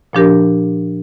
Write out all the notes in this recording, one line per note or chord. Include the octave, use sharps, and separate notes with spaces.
A#2 F3 D4 G4 A#4